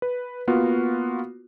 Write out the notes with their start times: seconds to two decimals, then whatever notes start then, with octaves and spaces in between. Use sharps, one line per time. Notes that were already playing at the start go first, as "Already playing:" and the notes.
0.02 B4
0.47 A#3 B3 F4 F#4